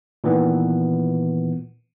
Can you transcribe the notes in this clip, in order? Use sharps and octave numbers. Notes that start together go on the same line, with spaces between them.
A#2 D#3 E3 B3